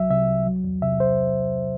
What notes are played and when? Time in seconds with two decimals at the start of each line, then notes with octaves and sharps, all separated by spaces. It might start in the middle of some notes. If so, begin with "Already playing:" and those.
Already playing: C2 F#3 E5
0.10 C3 E5
0.28 C2
0.46 F#3
0.64 E2
0.82 C3 E5
1.00 C5